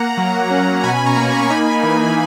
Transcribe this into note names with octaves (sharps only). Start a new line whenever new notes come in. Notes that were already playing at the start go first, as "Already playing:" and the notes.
Already playing: A#3 F#5 A#5
F#3
C#4
B2 G#5 B5
A#5 C#6
A#3
G#5 B5
C#6
D#4 G#5 B5
E3